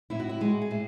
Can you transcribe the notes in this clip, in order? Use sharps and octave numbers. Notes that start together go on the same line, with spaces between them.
A2 E4
F#4
E4
G#3 F#4
G#4
A2